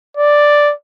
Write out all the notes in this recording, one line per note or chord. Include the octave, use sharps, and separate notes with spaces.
D5